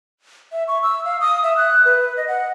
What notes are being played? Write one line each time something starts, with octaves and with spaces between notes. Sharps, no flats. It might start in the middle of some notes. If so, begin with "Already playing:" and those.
E5
C#6
E6
F5
D#6
E5
F#6
B4
D#5
F#5